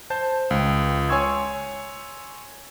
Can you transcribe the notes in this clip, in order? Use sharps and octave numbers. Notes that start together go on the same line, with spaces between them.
C5 A5 G6
C#2 G5
C#5 G#5 C6 C#6 E6 G#6